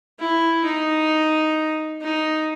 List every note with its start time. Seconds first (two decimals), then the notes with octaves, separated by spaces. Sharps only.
0.19 E4
0.65 D#4
2.01 D#4